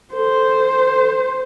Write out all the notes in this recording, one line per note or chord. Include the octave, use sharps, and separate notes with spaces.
A4 C5